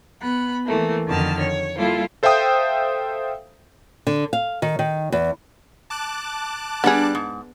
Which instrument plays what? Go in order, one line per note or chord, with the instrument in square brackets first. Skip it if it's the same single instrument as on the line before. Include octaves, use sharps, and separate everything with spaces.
[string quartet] B3 B5 F#6
E3 A3 A#3
F2 D3 D#3 A5 F6
C#5
G3 A#3 E4 F4 A4
[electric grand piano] A4 C5 E5 F5 G5 D#6
[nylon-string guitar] D3
F5
D#3
D#3
E2
[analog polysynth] A5 D6 F#6
[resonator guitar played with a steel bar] G3 D4 [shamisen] B3 G#4
[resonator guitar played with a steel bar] G#2